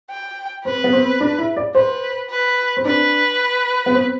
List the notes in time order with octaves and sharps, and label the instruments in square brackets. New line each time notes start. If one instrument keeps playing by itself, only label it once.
[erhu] G5
[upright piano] C4 [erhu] B4
[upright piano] B3
C4
D4
E4
D5
[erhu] B4 [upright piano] C5
[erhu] B4
[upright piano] C4
[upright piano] D4 [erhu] B4
[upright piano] B3
C4